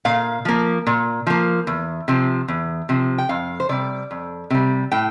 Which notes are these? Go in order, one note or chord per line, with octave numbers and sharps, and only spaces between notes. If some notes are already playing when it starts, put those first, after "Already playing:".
A#2 F5
F3 A#3
A#2
F3 A#3
E2
C3 F3
E2
C3 F3
G5
F2 F5
C5
C3 G3 D5
F2
C3 G3
A2 G5